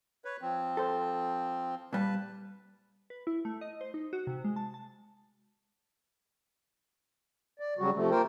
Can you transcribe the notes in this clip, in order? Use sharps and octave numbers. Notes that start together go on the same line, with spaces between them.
B4 C#5
F3 C4
A4 C5
A#2 G3 B4 A5
B4
E4
A3
D#5
C5
D#4
F#4
C3
G#3
A5
A5
D5
C#3 F#3 G3 F#4
C3 F3 A3
A#3 F4 A#4 C5 G5